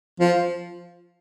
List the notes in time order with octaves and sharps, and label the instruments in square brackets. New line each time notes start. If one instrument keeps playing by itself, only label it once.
[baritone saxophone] F3